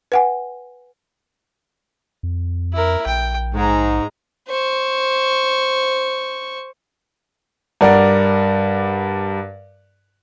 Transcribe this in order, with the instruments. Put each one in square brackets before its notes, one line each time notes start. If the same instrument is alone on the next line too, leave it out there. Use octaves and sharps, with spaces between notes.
[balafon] B4 F#5 G#5
[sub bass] F2
[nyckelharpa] E4 A#4
[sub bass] A#1 [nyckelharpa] G5
[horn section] G#2 [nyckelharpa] G#3 A#5
[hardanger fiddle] C5 C#6
[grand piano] G2 A#4 D5 F#5